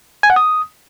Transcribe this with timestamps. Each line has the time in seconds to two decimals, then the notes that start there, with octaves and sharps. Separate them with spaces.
0.23 G#5
0.30 F#5
0.36 D#6